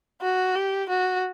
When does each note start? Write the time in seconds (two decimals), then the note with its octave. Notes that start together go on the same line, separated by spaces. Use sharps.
0.22 F#4
0.55 G4
0.89 F#4